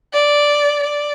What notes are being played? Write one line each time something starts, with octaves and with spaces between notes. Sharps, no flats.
D5
D5